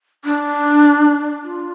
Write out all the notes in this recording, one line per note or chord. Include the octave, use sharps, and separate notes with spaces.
D4
F4